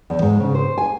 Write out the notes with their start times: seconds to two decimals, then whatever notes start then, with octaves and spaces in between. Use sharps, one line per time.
0.10 E2
0.22 G#2
0.40 C#3
0.54 C5
0.78 G#5